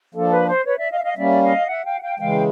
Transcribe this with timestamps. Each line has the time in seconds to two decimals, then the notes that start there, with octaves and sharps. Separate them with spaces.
0.15 F3 A#3 D4 A4
0.25 A#4
0.32 B4
0.48 C5
0.65 B4 C#5
0.78 D5 E5
0.91 D#5 F5
0.99 E5
1.04 D#5 F5
1.16 G3 A#3 C#4 D5 E5
1.42 D#5 F5
1.68 E5 F#5
1.85 F5 G5
1.99 F#5
2.02 F5 G5
2.19 C#3 E3 G#3 F5 G5